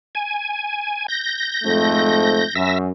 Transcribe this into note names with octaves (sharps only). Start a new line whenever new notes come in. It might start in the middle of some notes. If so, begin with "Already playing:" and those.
G#5
G6 A#6
F2 G#2 A3
F#2 E5 E6 A#6